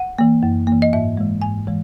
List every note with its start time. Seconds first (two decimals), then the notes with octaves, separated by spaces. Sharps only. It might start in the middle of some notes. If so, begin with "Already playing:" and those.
Already playing: F#5
0.18 E3 A#3
0.43 F#2
0.67 E3 A#3
0.82 D#5
0.93 G#2 E5
1.17 E3 G#3
1.42 G#2 G#5
1.67 E3 G#3